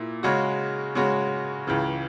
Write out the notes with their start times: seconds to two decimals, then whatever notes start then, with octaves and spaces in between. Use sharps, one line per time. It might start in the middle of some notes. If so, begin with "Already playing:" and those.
Already playing: A#2 E4
0.23 C#3 G#3 C#4 F#4
0.95 C#3 G#3 C#4 F#4
1.67 C#2 C#3 E3